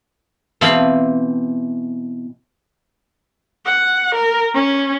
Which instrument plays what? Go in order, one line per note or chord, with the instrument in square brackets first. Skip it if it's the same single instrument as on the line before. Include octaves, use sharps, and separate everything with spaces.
[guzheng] B2 E3 C4 F5 A5 B5
[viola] F#5
A#4
C#4